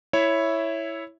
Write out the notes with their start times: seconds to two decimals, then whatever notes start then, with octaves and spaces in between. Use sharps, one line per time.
0.13 E4 C#5 E5